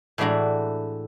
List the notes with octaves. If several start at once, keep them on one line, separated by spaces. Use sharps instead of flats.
A2 E3 G#3 D4 F#4 A#5